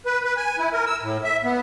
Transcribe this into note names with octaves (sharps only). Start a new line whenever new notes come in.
B4
B4
G#5
E4
A#4
E6
A2
E5
B3